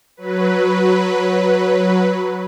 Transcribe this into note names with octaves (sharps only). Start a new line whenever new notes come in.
F#3 B4